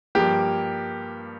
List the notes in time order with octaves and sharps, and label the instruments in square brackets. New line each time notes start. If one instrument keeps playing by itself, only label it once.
[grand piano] G2 F3 A#3 G4